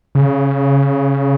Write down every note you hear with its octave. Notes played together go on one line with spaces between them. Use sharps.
C#3